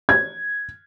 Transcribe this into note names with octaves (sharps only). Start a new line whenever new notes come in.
G#6